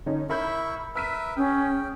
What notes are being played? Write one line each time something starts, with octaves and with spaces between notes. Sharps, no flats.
D3 C#4 D#4
E4 A#4 E5 B5 C#6 G6
A#4 B4 E5 E6 B6 D#7
C#4 G#4 G5